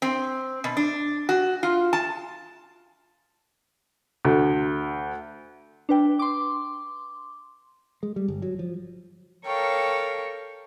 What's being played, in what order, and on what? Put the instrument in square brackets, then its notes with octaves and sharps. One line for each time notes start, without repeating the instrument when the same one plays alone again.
[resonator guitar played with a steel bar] C4
B2
D4
F#4
F4
A5
[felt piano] D2
[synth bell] D4 B4 G5
C6 D6
[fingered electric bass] G#3
G3
G1
F#3
F3
[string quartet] A4 A#4 C#5 F5 G5 C#6